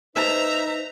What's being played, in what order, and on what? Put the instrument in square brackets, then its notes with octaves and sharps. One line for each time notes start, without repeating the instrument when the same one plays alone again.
[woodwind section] D#4 B4 [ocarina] C5 [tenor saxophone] E5 [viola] A#5